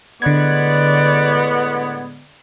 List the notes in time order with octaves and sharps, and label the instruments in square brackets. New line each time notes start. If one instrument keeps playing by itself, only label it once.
[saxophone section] A2 G#3 B3 [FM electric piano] D3 G#6 [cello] D5